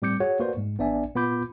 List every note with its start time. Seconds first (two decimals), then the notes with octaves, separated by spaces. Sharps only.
0.02 A2 G3 C4 D6 G6 C#7
0.20 F#4 G#4 C#5 F#5
0.40 A#3 F#4 B4 C5 D5
0.57 G#2 G#3
0.78 A1 B3 D4 D5 E5 G#5
1.15 A#2 B3 F4 B5 D6 G6